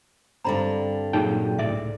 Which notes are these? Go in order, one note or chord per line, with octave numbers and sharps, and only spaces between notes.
G2 D3 C4 A#5 B5
A#2 F#3 D#4 G#4 G5
C#2 A2 D5 E5